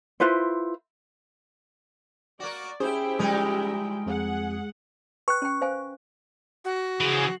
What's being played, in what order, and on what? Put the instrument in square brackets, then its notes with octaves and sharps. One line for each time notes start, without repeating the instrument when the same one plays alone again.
[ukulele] E4 F4 B4 C5
[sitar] A#3 F#4 [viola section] D5
[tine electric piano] C#4 G#4 [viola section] E4 G4 G5 [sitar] C5
[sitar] G3 D#4 F4 [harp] G#3
[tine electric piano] F2 [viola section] G#4 F#5
[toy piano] B4 G5 [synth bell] C#6 F#6
[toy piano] C#4 G5
C5 F5 G#5
[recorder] F#4
[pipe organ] C#3 G#4 [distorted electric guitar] E3 F3